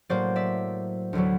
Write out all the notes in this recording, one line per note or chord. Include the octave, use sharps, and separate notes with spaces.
A2 F#3 A#3 C5 D5
D5 E5
D2 D3 F#3 B3